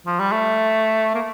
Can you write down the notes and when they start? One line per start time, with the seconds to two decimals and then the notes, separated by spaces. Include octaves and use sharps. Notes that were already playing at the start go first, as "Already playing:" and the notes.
0.06 F3
0.19 G3
0.32 A3
1.15 A#3